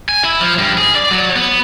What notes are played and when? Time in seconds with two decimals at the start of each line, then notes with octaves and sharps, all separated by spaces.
0.09 G#5
0.24 E4
0.41 F3
0.59 G2
0.77 G#4
0.95 D5
1.11 F#3
1.36 B3